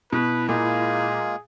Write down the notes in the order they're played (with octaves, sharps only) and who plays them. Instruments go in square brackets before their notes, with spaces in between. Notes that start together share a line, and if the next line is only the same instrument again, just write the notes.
[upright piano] B2 [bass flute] E4 [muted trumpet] B4
[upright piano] A#2 [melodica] G#3 A#3 F4 [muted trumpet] G#4